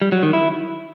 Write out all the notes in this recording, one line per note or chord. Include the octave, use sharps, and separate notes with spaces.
G3
F#3
D#3
E4